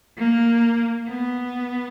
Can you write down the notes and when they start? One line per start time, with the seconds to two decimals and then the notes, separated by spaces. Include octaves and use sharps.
0.18 A#3
1.08 B3